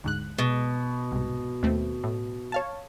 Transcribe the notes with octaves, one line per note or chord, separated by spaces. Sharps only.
D2 G#2 F#6
B2 G#3
C2 G#2
D#2 A3 C4
A2
C#5 F5 A5